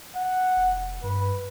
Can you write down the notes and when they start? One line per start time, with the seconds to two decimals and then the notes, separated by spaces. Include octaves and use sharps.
0.15 F#5
0.57 F1
1.04 G2 B4